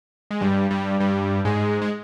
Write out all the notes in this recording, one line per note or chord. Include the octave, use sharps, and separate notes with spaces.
G#3
G2 G3
G2 G3
G2 G3
G#2 G#3
G#3